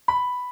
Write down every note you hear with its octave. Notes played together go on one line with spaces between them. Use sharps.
B5